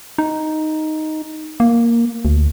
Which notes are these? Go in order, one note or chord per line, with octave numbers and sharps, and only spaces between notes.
D#4
A#3
D2